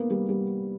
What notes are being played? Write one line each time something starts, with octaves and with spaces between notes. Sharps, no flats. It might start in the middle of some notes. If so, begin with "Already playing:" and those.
Already playing: A#3 B3
G3
G3